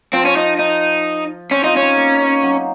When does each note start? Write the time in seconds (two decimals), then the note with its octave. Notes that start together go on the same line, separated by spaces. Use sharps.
0.13 F3 C4
0.25 C#4
0.37 D#4
0.59 D#4
1.51 C4 C#4
1.64 D#4 F4
1.76 C#4
1.82 D#4
1.97 A#3
2.43 F#3